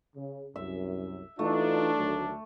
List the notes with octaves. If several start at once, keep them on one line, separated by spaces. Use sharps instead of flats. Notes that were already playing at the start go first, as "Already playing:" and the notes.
C#3
C2 F#2 E5
E3 A3 D4 D#4 F4
D2 D#3 F#3